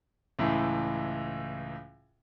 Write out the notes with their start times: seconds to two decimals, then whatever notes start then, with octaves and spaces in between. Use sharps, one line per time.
0.39 C#2 A2 E3